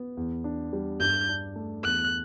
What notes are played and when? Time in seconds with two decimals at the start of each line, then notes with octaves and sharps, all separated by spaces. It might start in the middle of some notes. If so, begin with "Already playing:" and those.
Already playing: B3
0.17 E2
0.44 D4
0.73 G3
1.00 G2 G6
1.29 D4
1.56 A3
1.84 E2 F#6